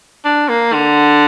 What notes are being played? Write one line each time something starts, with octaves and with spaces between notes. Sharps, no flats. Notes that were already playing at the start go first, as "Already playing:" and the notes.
D4
A#3
D3